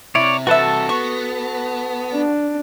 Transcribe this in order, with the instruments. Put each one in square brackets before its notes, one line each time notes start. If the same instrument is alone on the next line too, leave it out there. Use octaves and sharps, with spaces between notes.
[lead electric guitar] C3 [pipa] E4 [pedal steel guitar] C#5 D5
[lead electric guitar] C3 E3 [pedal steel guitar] F#4 A4 A5 [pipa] B4 E5
[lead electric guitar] B3 [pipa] C#6
[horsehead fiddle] D4